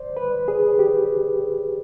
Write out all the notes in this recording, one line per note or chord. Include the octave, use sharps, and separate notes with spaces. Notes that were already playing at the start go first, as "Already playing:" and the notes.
Already playing: C5 D5
B4
G#4
G4